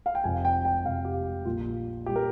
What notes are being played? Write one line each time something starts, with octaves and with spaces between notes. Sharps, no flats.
F5
G5
F1 F2 C3 G#5
G5
G5
F1 F2 C3 F5
G4
A#1 A#2 G3 A#3 F4
A#2 G3 A#3 G4
A#4